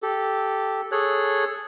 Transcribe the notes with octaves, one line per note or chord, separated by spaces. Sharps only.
G4 A4
G#4 A4 C#5 F#6